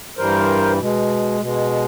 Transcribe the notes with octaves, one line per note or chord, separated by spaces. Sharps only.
G2 E3 G3 A#4 C5
B2 G#3
B2 G#3